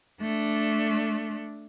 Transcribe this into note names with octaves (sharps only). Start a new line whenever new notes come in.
A3 D4